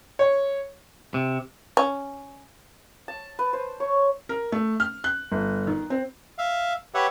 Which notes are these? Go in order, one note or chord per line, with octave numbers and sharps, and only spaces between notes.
C#5
C3
C#4
A5
B4
C5
C#5
A#4
A3
F6
F#6
G1
D#3
C4
E5 F5
G4 B4 C#5 E5 F#5